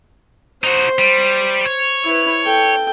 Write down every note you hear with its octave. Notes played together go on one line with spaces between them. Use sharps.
D#4 F#4 C5
G3
C#5
E4 B4
A4 G5